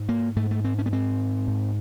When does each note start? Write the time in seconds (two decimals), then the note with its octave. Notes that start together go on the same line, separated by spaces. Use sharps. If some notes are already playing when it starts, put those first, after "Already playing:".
Already playing: G#2
0.09 A#3
0.36 G#2 A3
0.51 A3
0.64 C4
0.78 C#4
0.86 B3
0.92 G#2 C4
1.47 G#2